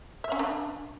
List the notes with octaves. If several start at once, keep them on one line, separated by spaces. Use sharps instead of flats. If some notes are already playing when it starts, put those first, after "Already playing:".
E5
C#4
D4